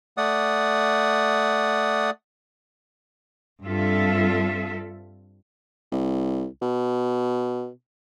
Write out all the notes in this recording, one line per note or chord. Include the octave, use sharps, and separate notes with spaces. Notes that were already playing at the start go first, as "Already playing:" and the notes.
A3 D5 F#5 D#6
G2 C4 F4 A4 E5
C2
B2